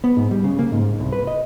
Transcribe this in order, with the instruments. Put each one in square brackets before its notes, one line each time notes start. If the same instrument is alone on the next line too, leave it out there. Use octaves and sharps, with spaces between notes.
[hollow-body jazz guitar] B3
G#2
G3
C#3
A#3
G#2
C2
B4
D#5